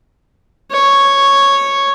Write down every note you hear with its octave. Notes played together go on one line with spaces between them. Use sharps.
C#5